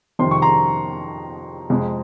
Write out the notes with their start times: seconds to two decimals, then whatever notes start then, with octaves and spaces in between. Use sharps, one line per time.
0.19 F2 C3 D#3 G3 C6
0.31 C#6
0.42 A#5 C6
1.70 F2 C3 F3 G#3